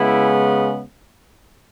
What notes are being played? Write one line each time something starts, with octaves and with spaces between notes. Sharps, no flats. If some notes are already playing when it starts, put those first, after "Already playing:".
Already playing: C#3 G#3 B3 E4